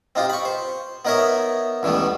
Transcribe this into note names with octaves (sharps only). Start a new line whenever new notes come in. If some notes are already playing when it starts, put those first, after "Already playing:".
C4 D#4 F4 G4
B5 C#6
C5
B3 D#4 A#4 C#5 E5
C#2 E3 G3 A3 B3